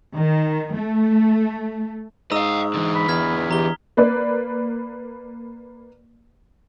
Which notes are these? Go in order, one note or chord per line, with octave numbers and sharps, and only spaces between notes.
D#3
A3
G#2 D#5 F5 A#5 D#6 E6
D3 E3
B5
E2 F6 G#6 B6
E2 G4 A#5 G7
A#3 B4 D5